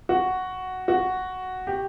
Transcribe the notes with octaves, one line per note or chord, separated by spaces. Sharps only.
F#4
F#4
G4